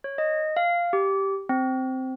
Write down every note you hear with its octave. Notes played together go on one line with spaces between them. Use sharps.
C#5
D#5
F5
G4
C4